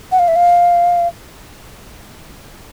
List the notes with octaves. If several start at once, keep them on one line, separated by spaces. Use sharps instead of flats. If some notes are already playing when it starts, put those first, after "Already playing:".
F#5
F5
E5
F5